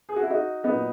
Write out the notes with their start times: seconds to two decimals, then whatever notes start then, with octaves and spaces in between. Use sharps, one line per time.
0.09 G#4
0.16 F#4
0.23 E4
0.30 D#4 F#4
0.63 A#2 F#3 B3 D#4